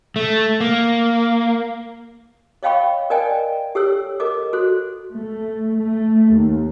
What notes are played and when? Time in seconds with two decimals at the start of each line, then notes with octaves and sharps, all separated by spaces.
0.16 A3
0.61 A#3
2.63 C#5 D#5 F5 G5 B5 C#6
3.10 A#4 D5 D#5 G5 G#5
3.75 G4 A4 C#5 E6
4.20 A4 A#4 D#5 D6
4.53 F#4 A4 C5
5.14 A3
5.77 A3
6.34 D#2